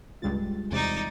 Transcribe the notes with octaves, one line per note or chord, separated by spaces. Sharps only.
C#2 G2 G3 G#3 F4 A6
E2 C3 D#4 D5